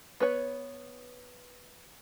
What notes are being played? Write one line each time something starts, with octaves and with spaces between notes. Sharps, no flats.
B3 B4 C#5